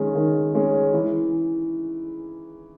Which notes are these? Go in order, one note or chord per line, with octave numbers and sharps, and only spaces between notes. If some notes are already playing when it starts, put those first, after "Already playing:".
Already playing: D#3 G#3 C#4
D#3
G#3 C#4
E3